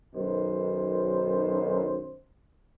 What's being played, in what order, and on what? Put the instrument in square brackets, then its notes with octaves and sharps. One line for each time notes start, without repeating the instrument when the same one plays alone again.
[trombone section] B1 F#2 D#3 C5